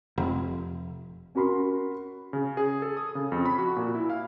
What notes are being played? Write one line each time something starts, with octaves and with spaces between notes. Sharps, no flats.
F1
C#4 F#4 A#4 B5 C6
C#3
G#4
A4
D#6
C#3
F2
B5
F#4
A#2
E4
F5